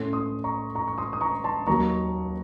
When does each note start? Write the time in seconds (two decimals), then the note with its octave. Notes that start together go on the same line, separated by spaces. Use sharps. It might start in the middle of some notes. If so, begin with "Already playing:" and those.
Already playing: A2 A3 C#4 C6
0.13 C6 D#6
0.44 A#5 C#6
0.75 A#5 C#6
0.88 C#6
0.98 C6 D#6
1.13 D#6
1.21 A#5 C#6
1.44 A5 C6
1.67 D#2 D#3 F#3 A#3 A#5 C#6